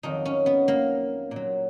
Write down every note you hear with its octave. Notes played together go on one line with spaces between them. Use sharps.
F2 D#3 F#3 D#4
C#4
B3
A#3
A#2 F#3